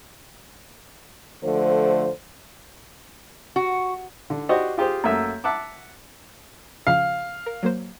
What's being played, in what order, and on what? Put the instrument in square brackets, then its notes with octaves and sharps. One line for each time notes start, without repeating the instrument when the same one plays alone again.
[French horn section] D3 F3 A3 C5
[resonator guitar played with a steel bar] F#4
[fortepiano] D3
F#4 G4 C5 D5 D#5
F4 G4 G#4 C5
F#2 A3 A#3 E5 E6
E5 F#5 A5 D6
[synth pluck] C#3 F3 [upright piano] F5
[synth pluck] A#4
F#3 A#3 C5